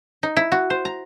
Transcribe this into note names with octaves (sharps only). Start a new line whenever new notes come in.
D#4
E4
F#4
C5
A#5